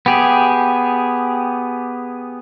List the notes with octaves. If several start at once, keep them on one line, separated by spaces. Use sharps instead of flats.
B3 G4 G#4